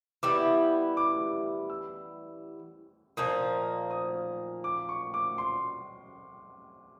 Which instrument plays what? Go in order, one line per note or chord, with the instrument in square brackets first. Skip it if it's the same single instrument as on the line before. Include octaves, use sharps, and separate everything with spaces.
[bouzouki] E3 G3 B3 E4 [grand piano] D6
[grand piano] D6
E6
[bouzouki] A#2 F3 A#3 D#4 [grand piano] D#6
[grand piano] D#6
D6
C#6
D6
C6